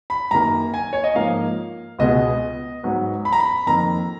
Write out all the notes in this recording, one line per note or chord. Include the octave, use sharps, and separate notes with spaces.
B5
F#2 D#3 A#3 A#5
G#5
C#5
D#5
G#2 F3 A#3 F5
C#2 B2 G#3 B3 D#5
G#2 F#3 B3
B5
A#5
B5
F2 D#3 A#3 A#5